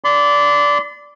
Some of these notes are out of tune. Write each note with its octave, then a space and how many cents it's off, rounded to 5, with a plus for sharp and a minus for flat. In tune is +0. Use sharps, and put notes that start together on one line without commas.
D5 -15 C6 -45